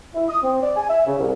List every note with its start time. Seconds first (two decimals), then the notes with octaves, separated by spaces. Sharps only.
0.14 E4
0.29 D#6
0.43 C4
0.62 D5
0.77 G#5
0.89 E5
1.07 C#3
1.19 C2